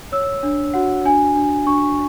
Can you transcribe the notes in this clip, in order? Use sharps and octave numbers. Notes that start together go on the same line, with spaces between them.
C#5 E6
D4
F#4 F#5
D4 G#5
D4
D4 C#6